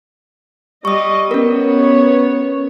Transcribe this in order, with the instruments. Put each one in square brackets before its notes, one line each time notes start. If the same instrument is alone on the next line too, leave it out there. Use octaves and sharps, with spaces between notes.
[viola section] G3 D#5 [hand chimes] C#6 D#6
[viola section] B3 C#5 [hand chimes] C#4 A#4